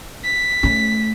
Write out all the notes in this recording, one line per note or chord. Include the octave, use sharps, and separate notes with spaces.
B6
A3 C#4